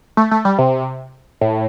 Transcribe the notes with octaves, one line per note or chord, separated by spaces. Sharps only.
A3
A3
G3
C3
A2